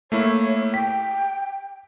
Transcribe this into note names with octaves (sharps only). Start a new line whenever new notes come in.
A3 A#3 E4 C#5
G5 B6